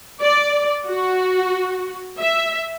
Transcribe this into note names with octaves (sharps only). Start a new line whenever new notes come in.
D5
F#4
E5